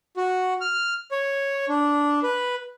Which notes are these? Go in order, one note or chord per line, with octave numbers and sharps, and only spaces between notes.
F#4
F6
C#5
D4
B4